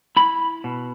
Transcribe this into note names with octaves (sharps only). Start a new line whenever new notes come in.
E4 B5
B2